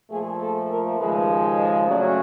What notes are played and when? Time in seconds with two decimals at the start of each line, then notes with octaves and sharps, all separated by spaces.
0.10 A#2 F3 A3 G#4
0.39 A4
0.70 A#4
0.98 D#2 C#3 F3 G#3 B4
1.41 D#5
1.86 C#3 F#3 A3 C#4 D5